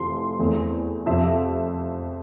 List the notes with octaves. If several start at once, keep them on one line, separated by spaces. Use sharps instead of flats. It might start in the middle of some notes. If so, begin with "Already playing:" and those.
Already playing: F1 F2 C3 E3 C6
E2 E3 A3 C4
F2 C3 F3 C4 E5